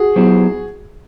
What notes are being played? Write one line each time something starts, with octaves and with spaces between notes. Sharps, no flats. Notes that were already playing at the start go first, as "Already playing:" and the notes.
Already playing: F#4 G#4
F#3 B3 E4 G4 C5